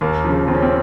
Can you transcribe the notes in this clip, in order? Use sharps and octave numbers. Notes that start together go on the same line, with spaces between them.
D#2 A#3
C#3 F3
D#2 C4
C#4
C4